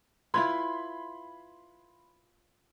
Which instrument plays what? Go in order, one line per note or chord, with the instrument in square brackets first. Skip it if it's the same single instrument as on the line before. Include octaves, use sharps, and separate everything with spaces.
[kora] E4 F4 B4 [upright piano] B5 C6 G#6